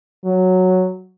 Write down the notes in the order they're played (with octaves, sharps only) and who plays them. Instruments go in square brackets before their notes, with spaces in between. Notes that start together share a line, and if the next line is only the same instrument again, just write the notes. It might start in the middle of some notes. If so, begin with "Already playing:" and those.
[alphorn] F#3